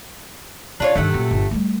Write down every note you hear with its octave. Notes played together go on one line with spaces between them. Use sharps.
C#3 D4 F4 C#5
G2 C3 D#3 A3 F#5
F#2 A#2
G1
G3 A3